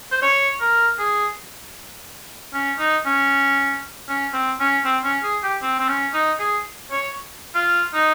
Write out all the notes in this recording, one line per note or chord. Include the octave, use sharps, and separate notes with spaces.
C5
C#5
A#4
G#4
C#4
D#4
C#4
C#4
C4
C#4
C4
C#4
G#4
G4
C4
C4
C#4
D#4
G#4
C#5
F4
D#4